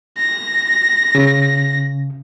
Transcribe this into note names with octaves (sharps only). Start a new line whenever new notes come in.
A#6
C#3